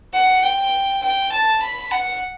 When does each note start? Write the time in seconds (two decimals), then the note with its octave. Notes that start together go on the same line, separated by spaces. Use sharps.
0.14 F#5
0.43 G5
1.02 G5
1.32 A5
1.62 B5
1.91 F#5